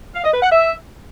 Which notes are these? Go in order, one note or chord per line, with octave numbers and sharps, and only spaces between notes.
F5
D#5
B4
F#5
E5